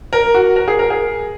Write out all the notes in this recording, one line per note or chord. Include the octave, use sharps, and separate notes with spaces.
A#4
F#4
A#4
G#4
A#4
G#4